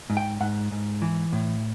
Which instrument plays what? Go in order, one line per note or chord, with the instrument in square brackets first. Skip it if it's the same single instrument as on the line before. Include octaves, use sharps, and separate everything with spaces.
[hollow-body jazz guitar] G#2
G5
G#2 F#5
G#2
E3
A2